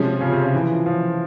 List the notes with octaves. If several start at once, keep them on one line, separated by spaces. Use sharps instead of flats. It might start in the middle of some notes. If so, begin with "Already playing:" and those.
Already playing: C3 F3 G#3 C#4
C#3
C3
C#3
E3
F3